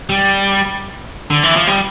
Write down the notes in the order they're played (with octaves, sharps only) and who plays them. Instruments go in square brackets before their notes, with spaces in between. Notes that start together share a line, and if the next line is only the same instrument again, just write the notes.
[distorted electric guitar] G3
D3
E3
F3
G3